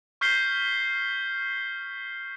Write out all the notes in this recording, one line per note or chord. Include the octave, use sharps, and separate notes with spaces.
C#6 F6 G6 B6 C7 G7